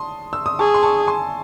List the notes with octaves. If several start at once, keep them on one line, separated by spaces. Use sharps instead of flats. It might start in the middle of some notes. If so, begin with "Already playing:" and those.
Already playing: A5 C6 D#6
E6
D#6
G#4 A5 C#6
C6
A5 C#6
G#5 C6